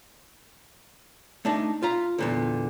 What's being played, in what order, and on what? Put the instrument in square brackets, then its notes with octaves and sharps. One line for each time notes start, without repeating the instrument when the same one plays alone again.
[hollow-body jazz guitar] A3 D4 D#4
F4 F5 A#5
E2 A#2 D3